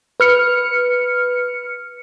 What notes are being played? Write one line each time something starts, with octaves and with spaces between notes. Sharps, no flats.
B4 F6 C#7